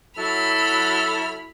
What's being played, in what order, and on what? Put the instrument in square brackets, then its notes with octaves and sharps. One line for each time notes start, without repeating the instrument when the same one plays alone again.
[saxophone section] F#3 E4 [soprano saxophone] A4 [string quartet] B5 F6